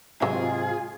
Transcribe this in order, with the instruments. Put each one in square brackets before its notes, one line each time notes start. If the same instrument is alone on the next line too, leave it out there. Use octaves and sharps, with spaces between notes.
[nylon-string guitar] G#2 C3 [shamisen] F#3 G4 [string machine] F4 [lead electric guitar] G#4